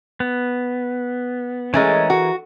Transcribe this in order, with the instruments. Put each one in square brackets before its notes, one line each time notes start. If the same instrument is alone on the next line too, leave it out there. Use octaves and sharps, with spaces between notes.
[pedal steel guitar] B3
[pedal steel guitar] E3 G#4 A#4 [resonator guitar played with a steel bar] G#3 A3 C#4
[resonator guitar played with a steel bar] F#4